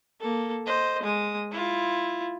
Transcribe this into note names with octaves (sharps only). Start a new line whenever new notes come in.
A#3 A4
C5 D#5
G#3 D#6
E4 F4